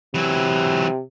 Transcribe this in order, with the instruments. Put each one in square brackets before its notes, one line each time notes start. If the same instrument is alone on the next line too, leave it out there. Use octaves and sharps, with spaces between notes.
[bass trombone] C3 [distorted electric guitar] E3 F#3